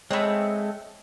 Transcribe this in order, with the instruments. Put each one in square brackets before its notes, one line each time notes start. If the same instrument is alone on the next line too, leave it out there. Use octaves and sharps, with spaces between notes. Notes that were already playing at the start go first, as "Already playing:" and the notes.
[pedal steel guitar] G#3 [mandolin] A3 C4 [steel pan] C#5 D#5 B5